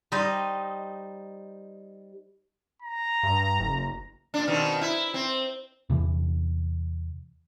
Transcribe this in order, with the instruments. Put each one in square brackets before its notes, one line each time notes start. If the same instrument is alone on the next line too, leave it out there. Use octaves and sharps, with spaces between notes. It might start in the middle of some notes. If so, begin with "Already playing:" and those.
[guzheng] G3 D#4 C5 D#5
[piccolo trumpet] A#5
[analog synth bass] G2
F#1
[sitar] A#2 D4
B2 D#3 C4
E4
C4
[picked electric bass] E2 C3 E3